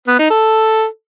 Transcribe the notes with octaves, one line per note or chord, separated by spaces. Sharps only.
B3
D#4
A4